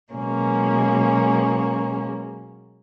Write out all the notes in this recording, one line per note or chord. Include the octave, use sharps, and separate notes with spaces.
B2 F#3 G#3 A#3 C#4